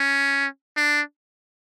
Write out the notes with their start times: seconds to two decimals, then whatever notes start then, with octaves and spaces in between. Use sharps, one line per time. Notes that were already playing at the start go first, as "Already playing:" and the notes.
Already playing: C#4
0.77 D4